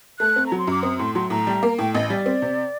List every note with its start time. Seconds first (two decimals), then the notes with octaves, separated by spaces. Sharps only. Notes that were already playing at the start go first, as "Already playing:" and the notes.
0.19 A3 F#6
0.36 C4
0.47 A#5
0.52 F#3
0.58 C6
0.67 F#2 D6
0.83 C4 D#6
0.99 A2 C6
1.15 F#3 C6
1.30 A2 A#5
1.47 G3
1.63 A#3
1.78 A2 G5
1.94 A1 D#5
2.10 G3 D5
2.26 C4
2.42 C3